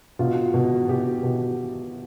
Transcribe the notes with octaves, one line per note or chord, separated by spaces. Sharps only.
B2 F4
B2
B2 G4
B2